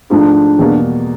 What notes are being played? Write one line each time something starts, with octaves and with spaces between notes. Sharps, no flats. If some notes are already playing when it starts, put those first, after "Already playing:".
G#2 F3 A3 D4
E2 B2 G3 A#3